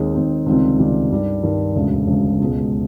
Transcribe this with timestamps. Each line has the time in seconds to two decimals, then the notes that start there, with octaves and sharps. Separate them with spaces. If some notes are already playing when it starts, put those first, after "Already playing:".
Already playing: D#2 D#3 G#3 C4 D#4
0.14 D#2 D#3 G#3 C4 D#4
0.46 C#2 C3 D#3 G3 C4
0.78 C#2 C3 D#3 G3 C4
1.11 G2 D#3 G3
1.43 G2 D#3 G3
1.76 E1 D2 C#3
2.07 E1 D2 C#3
2.40 C#2 B2 G#3